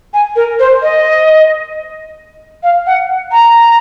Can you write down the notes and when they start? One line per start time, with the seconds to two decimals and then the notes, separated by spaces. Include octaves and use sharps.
0.14 G#5
0.36 A#4
0.59 C5
0.82 D#5
2.63 F5
2.87 F#5
3.32 A#5